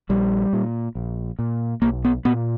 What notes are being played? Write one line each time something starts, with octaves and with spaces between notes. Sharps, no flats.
A#1 G3
A#2
A#1
A#2
B1 A#3
B3
A#2 B3